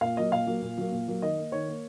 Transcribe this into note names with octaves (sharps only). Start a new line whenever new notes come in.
A#2 F5
F#3 A#3 D#5
A#2 F5
F#3 A#3
A#2
F#3 A#3
A#2
F#3 A#3
D#3 D#5
A#3
D#3 C#5
A#3